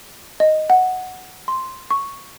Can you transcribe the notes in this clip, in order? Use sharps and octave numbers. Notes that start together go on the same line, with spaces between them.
D#5
F#5
C6
C#6